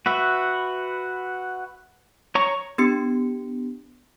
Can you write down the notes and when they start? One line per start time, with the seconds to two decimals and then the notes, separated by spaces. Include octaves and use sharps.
0.06 F#4 B4 E5
2.35 C#5 A#5 C#6
2.78 B3 D4 G4 C#7